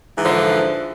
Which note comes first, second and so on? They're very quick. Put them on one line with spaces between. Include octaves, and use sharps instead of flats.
E3 G#2 D3 F3